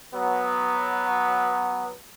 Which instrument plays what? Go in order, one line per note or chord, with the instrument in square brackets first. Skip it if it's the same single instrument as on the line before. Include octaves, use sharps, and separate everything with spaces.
[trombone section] F#3 B3